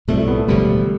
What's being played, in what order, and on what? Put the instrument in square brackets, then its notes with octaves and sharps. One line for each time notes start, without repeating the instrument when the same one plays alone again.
[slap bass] B1 A2 G3 C4 [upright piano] A3
[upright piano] A3
B3
A3
[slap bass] E1 D2 D3 F3 [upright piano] G3